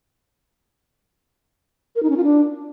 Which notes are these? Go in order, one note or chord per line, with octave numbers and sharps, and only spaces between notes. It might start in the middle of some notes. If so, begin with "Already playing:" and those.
A#4
D#4
C#4
F4
D4